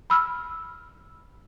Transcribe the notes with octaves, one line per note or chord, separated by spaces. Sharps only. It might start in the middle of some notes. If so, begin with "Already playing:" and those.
B5 E6 F6